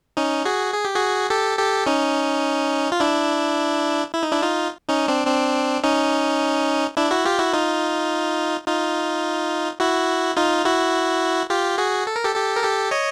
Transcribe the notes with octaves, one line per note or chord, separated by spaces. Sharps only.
C#4 D#4
F#4 G#4
G#4
G4
F#4 G#4
G4 A4
G4 A4
C#4 D#4
F4
D4 E4
E4
D#4
D4 E4
D#4 F4
C#4 D#4
C4 D4
C4 D4
C#4 D#4
D4 E4
E4 F#4
F4 G4
E4 F#4
D#4 F4
D#4 F4
E4 F#4
D#4 F4
E4 F#4
F4 G4
F#4 G#4
A4
A#4
G4 A4
G4 A4
A#4
G4 A4
C#5 D#5